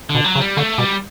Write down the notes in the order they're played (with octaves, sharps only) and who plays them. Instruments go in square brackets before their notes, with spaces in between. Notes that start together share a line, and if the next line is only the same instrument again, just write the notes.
[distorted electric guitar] D3
[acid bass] B2
[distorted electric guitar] F#3
[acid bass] C#3
[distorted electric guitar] G3
[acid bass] D3 [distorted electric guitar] A3
[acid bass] B2 [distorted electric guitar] G3